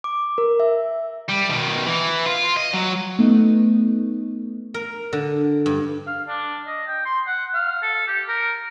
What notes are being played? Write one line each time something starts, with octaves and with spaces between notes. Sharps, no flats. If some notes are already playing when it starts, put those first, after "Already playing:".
D6
A#4
E5
G3
B2 D#3
E3
F4
D#5
F#3
A3 B3 D#4
A#4
D3
G2
F5
D4
D#5
G5
C6
F#5
F5
A4
G4
A#4